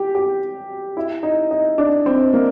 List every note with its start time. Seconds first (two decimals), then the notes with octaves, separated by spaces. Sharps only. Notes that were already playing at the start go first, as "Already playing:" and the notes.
Already playing: G4
0.15 G4
0.97 E4
1.23 D#4
1.51 D#4
1.78 D4
2.06 C4
2.34 A#3